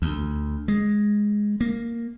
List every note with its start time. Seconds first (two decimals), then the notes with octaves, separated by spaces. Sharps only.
0.02 D2
0.68 G#3
1.61 A#3